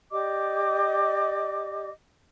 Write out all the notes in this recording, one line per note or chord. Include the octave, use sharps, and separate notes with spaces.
G4 D5 D#5 D6